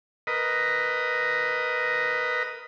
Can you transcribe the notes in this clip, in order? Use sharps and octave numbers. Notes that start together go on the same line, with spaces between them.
A#4 B4 D#5